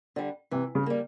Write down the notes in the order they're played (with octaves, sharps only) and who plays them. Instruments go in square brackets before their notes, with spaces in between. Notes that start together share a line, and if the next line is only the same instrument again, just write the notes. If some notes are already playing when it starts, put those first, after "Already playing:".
[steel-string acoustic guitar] D3 G3
[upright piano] C3 [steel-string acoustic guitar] E3
[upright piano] C#3
[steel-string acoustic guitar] G3 A#3